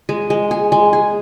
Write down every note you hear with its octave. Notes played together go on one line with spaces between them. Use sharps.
G#3
G#3
G#4
G#3
G#4